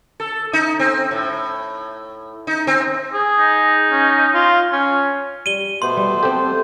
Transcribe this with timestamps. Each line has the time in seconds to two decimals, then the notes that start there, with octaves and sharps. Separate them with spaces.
0.20 A4
0.53 D#4
0.79 C4
1.11 A2
2.47 D#4
2.67 C4
3.14 G#4
3.39 D#4
3.92 C#4
4.34 F4
4.73 C#4
5.46 G3 D#7 G7
5.82 B2 A3 B3 C5 C6
5.97 G3
6.23 C4 G4 A4